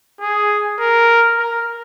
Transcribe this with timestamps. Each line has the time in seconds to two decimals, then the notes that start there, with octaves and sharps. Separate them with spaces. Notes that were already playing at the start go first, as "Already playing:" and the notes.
0.21 G#4
0.80 A#4
1.38 A#4